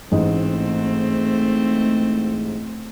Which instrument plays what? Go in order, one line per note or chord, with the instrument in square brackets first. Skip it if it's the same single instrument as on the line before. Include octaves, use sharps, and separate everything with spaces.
[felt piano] A1 G#2 D#5 [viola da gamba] A3 C4